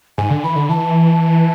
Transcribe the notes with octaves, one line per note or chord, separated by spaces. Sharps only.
G#2 G#5
D3
E3 B5
D3
E3 A5